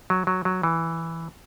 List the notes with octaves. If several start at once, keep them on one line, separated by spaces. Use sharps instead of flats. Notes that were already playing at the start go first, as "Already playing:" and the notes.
F#3
F#3
F#3
E3